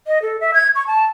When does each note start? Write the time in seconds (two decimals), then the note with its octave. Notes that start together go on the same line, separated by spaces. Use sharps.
0.07 D#5
0.22 A4
0.41 E5
0.54 G#6
0.75 C#6
0.87 A5